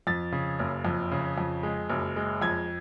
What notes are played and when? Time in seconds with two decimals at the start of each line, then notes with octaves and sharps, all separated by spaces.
0.07 F2 A6
0.32 C#3
0.59 F#1
0.85 F2
1.12 C#3
1.38 F2
1.63 G#3
1.90 F#1
2.16 G#3
2.42 F2 G#6